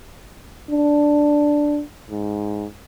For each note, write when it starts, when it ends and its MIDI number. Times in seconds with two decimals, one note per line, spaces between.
0.71 1.82 62
2.10 2.66 44